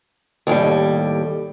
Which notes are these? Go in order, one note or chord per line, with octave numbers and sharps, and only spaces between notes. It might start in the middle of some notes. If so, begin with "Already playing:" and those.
D#2 A2 G3